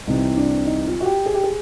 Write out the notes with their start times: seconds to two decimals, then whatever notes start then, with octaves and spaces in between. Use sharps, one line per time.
0.07 C2 C3 E3 D#4
0.37 D4
0.66 D#4
0.87 F4
1.01 F#4
1.05 G4
1.26 G#4
1.34 G4
1.43 G#4